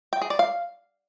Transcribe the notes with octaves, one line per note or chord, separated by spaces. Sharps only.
G5
G#4
D5
F5